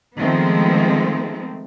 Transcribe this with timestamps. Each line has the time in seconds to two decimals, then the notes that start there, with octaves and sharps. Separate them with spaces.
0.18 D#3 F3 G#3 A3 B3 C4